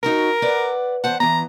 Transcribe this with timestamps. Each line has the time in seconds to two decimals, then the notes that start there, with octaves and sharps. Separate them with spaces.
0.03 D#4 F#4 A#4 C#5
0.42 B4 D5 F#5
1.04 E2 C5 F#5 A5
1.20 E3 B3 A#5